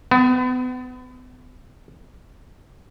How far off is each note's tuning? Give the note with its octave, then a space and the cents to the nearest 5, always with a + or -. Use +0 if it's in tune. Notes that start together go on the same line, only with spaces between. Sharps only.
B3 +35